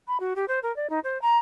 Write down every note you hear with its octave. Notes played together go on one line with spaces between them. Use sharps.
B5
F#4
G4
C5
A#4
D5
D#4
C5
A#5